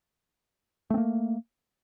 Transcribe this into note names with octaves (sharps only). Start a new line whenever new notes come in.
A3 A#3 C4